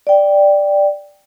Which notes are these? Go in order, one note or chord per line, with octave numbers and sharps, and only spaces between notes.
D5 G5